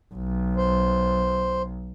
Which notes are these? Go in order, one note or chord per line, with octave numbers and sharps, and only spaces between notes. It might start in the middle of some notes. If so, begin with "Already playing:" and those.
B1
C5